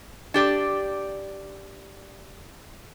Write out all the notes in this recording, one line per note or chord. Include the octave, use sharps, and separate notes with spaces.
D4 G4 D5